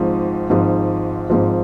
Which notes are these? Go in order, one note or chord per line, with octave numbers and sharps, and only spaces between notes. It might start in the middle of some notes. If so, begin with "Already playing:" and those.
Already playing: G#1 G#2 F3
G#1 G#2 F3
G#1 G#2 F3